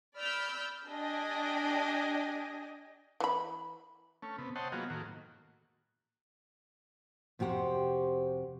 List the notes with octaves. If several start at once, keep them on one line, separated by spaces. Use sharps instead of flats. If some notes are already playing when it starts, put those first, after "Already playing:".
D5 B5 E6 F6 G6
D4 G4 D5 D#5 G#5
E3 B5
A3 C#4
C3 B3
C5 C#5 D#5 F#5 G5 A5
F#3 A#3 B3 F4 F#4 G#4
A2 D#3 A#3 F#4
F2 C3 F#4 G4 C5